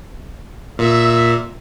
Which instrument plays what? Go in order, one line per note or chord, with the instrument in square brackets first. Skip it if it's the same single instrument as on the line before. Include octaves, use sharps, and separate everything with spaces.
[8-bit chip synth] A#2 [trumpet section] E5